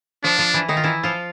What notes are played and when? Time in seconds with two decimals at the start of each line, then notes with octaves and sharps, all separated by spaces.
0.24 F3 D4 F4
0.39 F3 F4
0.54 E3 E4
0.69 D#3 D#4
0.77 F4
0.84 E3 E4
1.03 F3 F4